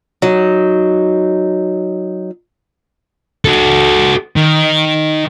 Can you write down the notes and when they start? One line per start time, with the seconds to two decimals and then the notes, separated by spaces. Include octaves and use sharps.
0.22 F#3 D#4
3.45 F#4 A4
4.36 D#3